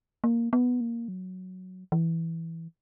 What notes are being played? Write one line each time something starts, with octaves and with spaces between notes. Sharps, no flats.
A#3
B3
A#3
F#3
E3